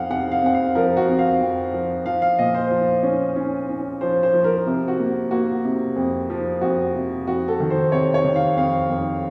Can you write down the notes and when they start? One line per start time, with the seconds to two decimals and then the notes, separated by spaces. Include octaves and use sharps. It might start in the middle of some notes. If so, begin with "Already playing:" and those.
Already playing: F2 C4 F5 F#5
0.10 C3 F#5
0.32 F5
0.43 C4 F#5
0.54 F5
0.75 F3 A#4
0.97 F#4
1.09 C4
1.19 F5
1.41 F2
1.73 F3
2.05 F3 F5
2.22 F5
2.39 A#2 D#5
2.55 C5
2.71 F3
3.03 C#4
3.36 C#4
3.69 C#4
4.01 F3 C5
4.23 C5
4.34 F3
4.44 A#4
4.67 C3
4.88 F#4
4.99 A#3
5.31 A#3 F#4
5.64 C3
5.96 F2
6.30 F3
6.61 F2 F#4
6.95 C3
7.27 F2 F#4
7.48 A4
7.60 D#3
7.70 C5
7.92 C3 C#5
8.14 C#5
8.25 D#3
8.36 F5
8.57 F2 F5
8.90 F2